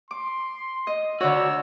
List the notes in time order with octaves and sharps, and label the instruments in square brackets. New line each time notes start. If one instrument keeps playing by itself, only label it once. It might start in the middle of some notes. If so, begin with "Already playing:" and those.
[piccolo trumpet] C6 [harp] D6
[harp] D#5
[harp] D3 C#5 [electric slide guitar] F#4 D5 [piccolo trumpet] E6